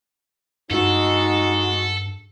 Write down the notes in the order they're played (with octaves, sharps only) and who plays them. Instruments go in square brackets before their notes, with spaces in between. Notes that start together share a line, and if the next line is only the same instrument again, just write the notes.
[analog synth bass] G2 [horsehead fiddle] G#3 F#4 [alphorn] D#4 [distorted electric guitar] A4